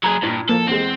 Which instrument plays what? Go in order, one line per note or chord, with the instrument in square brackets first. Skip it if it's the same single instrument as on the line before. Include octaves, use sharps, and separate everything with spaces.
[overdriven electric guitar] F#3 G#4 [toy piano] A#5 [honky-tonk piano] B5 G#6
[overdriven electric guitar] G2 [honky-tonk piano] A#2 [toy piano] E4
[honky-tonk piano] F3 [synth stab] A#3 [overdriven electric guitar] A4
[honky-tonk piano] E2 G#3 [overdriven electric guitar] C4